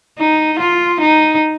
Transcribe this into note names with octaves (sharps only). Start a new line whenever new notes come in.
D#4
F4
D#4